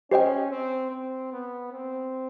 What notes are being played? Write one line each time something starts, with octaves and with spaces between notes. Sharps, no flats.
C#4 G4 C5 D#5 G5
C4
C4
B3
C4